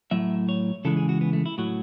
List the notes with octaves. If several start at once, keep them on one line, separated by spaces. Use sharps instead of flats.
A2 F#3 E5
C#5
C#3 E3 G#3 A4
G#4
F#4
B3
A3
E4
A2 F#3 F#4